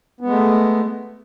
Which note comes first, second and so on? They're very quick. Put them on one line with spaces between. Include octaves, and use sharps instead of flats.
B3 G#3 A3